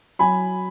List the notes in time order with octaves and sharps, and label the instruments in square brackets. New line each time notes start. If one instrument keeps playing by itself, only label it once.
[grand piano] F#3 G#5 B5